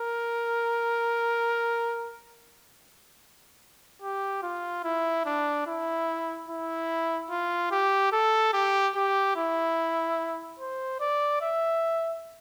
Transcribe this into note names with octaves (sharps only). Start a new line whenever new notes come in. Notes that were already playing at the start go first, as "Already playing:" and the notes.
Already playing: A#4
G4
F4
E4
D4
E4
E4
F4
G4
A4
G4
G4
E4
C5
D5
E5